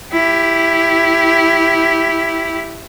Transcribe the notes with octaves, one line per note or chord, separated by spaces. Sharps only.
E4 G4